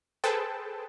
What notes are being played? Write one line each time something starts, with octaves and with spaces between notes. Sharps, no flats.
G#4 A4 B4 C5 G5 A5